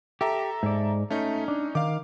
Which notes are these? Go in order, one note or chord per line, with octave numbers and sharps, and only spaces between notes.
G4 A4 E5 A#5
G#2 D5
A3 C#4 D#4
D4
D#3 F5 D6